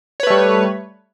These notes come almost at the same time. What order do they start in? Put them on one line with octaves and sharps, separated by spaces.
C#5 B4 A3 G3